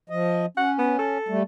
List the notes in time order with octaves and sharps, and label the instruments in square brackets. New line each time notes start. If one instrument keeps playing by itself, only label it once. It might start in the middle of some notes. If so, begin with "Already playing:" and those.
[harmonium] F3 D#5
[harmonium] C#4 [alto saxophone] F#5
[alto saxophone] B3
A4
[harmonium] G3 A3